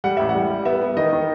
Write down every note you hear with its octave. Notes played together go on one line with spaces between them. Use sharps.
G3 F#5
A1 E5
F#5
G3
G3
B3 E5
B3
D#3 D#5
D#3